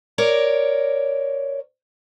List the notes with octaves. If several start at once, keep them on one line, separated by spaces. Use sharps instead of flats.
A#4 C#5 D5